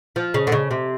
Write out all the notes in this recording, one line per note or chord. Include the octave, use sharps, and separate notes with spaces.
F3
C#3
D3
C#3
C3